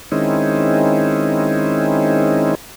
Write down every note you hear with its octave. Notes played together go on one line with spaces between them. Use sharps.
D#3 G#3 C4 C#4 D#4 E4